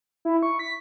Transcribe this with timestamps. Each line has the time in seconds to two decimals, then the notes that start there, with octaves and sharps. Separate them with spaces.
0.25 E4
0.43 C#6
0.59 B6